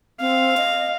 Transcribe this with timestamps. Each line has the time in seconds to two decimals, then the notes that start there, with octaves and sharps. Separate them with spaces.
0.20 C4 F5
0.57 D#5